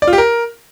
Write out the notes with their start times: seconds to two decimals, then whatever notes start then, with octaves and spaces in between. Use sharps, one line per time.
0.02 D5
0.07 F4
0.13 G4
0.18 A#4